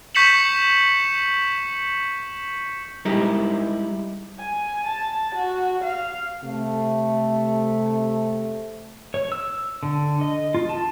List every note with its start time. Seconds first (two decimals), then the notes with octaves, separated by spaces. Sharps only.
0.15 C#6 G6 B6 C#7 E7 F#7
3.05 G3 G#3 D#4 E4 G4
4.39 G#5
4.87 A5
5.35 F#4
5.83 F5
6.43 C3 A3
9.14 C#5
9.32 E6
9.83 D3
10.21 D#5
10.54 F4
10.69 A5